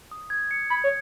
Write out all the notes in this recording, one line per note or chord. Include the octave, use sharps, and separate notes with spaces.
D#6
G#6
C#7
B5 G#6
C#5